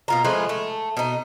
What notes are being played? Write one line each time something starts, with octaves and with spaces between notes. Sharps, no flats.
B2 F4 A#5
F3 G#3 A3 B4
A3
B2 D#4